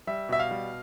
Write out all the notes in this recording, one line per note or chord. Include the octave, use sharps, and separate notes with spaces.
G3 E5
B2 E5
F5
G3